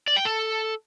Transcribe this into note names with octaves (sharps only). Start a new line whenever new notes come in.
D5
G5
A4